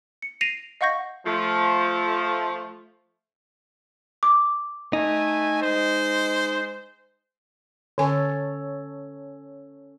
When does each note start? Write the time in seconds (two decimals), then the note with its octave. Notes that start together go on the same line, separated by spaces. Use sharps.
0.22 C#7
0.41 A#6 C7 D7 D#7 F7
0.81 D#5 F5 F#5 C#6 G6 A#6
1.26 F3 A3
4.23 D6
4.93 A3 D#4 G#5
5.61 G#3 C5
7.98 D3 C#4 A4 C#5 G#5